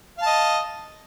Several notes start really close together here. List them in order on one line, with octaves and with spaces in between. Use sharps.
F5 A5 D#5